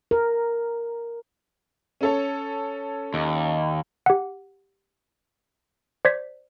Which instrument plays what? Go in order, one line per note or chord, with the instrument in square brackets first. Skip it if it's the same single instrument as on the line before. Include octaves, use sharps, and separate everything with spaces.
[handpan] A#4
[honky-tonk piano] C#4 A4 C#5
[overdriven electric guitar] D#2
[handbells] G4 F#5
C5 D5 G#6 B6